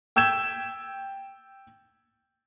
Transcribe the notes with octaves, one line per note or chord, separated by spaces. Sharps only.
G5 E6 G6 G#6 E7